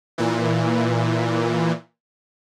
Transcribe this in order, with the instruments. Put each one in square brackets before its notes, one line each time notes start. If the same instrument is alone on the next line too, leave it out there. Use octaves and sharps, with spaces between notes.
[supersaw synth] A#2 E3